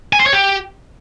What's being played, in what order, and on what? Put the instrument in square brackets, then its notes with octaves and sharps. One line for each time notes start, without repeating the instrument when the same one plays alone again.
[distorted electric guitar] G#5
C5
C#5
G4